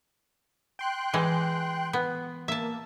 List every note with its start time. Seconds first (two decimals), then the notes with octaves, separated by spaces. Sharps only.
0.79 G5 C6 F#6
1.14 E3 G#3
1.93 B3
2.48 A#3 E5 A5